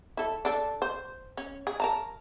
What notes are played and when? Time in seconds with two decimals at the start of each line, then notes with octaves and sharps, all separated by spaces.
0.17 E4 A4
0.45 D4 A4
0.82 C5
1.37 C#4
1.67 G#4
1.80 A#4 A5 A#5